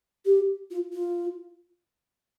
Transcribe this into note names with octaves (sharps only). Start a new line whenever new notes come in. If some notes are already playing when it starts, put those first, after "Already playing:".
G4
F4
F4